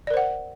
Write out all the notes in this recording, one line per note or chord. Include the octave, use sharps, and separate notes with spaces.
A#4 C5 D5 F#5